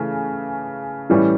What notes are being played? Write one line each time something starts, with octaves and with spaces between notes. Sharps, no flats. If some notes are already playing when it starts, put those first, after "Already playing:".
Already playing: C#3 E3 A3
A2 E3 G3 C#4